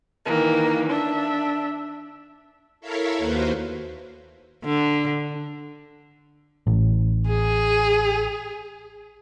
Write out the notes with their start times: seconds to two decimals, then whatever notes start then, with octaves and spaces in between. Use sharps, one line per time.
0.25 D#3 E3 A#3
0.89 D4 E5
2.80 E4 A4 A#4 C#5 E5 F5
3.18 D#2 A#3 F#4 B4 C5
4.64 D3
6.67 A1
7.27 G#4